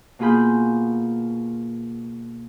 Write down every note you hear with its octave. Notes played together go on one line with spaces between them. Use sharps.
B2 A#3 F4 G#4 B5 G6